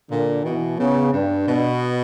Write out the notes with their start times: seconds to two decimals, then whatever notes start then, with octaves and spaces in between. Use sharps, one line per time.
0.11 A#2 D3
0.45 B2 E3
0.79 C#3 B3
1.13 G2 D4
1.47 B2